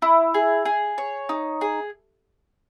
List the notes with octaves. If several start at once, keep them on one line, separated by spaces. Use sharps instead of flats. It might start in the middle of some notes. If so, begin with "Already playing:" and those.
E4
G#4
G#4
C#5
D#4
G#4